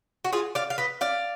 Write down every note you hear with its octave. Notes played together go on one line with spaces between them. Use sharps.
F#4
F4 G#4
D5 F5
F5
B4 D#5
D5 F5